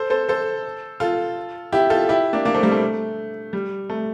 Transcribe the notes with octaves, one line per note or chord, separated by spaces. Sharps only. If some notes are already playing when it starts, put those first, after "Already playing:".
Already playing: A4 C5
A4 C5
A4 C5
F4 A4
E4 G4
F4 A4
E4 G4
A#3 D4
A#3 D4
A3 C4
G3 A#3
A3
G3
A3